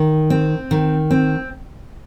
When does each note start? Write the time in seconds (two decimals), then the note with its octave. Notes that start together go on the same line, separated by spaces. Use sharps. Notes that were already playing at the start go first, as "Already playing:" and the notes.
Already playing: D#3
0.30 C4
0.71 D#3
1.11 C4